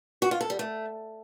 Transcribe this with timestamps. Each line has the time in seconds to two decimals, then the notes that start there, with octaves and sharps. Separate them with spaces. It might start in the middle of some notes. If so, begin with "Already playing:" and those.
0.22 F#4
0.31 F4
0.41 A4
0.50 G3
0.59 A3